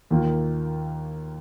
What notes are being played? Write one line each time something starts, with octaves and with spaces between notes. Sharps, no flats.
D#2 D#3 A#3 F4